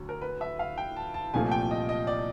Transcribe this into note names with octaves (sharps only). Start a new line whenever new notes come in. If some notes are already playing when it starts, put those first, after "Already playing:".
Already playing: D2 F#3
A#4
B4
E5
F5
G5
A5
A5
C2 A#2 F3 A3 G#5
G5
D#5
D#5
D5